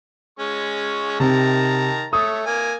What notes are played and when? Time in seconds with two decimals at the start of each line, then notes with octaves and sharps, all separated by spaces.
0.39 G#3 C#4 C#6
1.20 C3 D#3 A5 A#5
2.13 A3 C#5 D#6
2.47 A#3 G#5